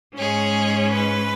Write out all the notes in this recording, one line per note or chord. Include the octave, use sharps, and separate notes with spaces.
G#2 G#3 C#4 G#4 C#5
B4